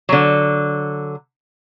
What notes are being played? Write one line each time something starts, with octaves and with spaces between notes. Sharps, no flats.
D3 F#3